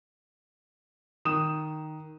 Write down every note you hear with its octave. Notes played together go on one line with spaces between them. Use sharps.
D#3 D#6 E7